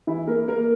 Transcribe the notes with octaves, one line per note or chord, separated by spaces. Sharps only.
E3 E4
A#3 A#4
A#3 A#4